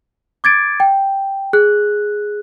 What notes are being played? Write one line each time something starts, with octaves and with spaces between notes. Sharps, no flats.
D6 G#6 A6 D7
G5
G#4 F#6